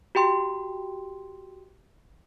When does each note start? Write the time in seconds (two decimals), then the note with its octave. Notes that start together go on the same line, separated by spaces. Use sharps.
0.15 F#4 G4 G5 C6